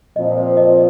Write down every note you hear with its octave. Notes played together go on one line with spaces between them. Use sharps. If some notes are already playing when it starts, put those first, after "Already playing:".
A#2 F3 C4 D#5
C5
D#5